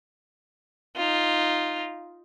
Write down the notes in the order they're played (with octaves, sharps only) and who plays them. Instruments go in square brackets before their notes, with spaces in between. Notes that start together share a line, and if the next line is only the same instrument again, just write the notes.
[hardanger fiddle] D#4 F4